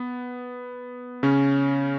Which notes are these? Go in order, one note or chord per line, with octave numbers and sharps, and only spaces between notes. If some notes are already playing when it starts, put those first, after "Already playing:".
Already playing: B3
C#3 C#4